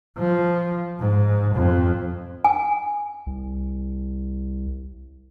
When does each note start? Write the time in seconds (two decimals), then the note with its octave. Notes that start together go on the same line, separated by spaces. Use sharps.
0.18 F3
0.99 G#2
1.55 F2
2.44 G#5
3.27 C2